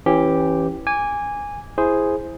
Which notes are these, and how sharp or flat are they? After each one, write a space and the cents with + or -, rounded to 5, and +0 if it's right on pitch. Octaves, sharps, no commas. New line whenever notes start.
E3 +0 C#4 -20 G4 +0
G#5 -15 D6 -15
E4 +0 G#4 +0 C5 +0